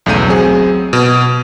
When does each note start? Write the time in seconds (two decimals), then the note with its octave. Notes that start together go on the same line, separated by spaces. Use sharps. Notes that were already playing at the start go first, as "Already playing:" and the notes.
0.06 B1 E2 C#3 A3 G6 D#7
0.27 F#3 C4 G#4
0.93 B2